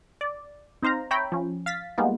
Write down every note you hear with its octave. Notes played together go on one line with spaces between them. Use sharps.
D5
C4 D#4 C5 F5 A#5
C#5 E5 G5 A#5 B5
F3 C#4
F5 A6 B6
G3 G#3 A#3 B3 D#4 F4